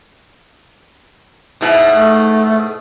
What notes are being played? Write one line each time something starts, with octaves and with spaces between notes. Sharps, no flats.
G#2 B2 E4
A3